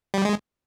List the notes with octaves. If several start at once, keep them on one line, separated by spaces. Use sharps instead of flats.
G3
G#3